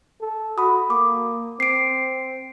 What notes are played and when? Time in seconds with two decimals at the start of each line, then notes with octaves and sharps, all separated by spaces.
0.21 A4
0.58 F#4 B5 D#6
0.90 A#3 D6
1.60 C4 C7 D7